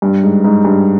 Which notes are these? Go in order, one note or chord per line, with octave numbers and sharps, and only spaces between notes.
G2
G#2
G#2
G2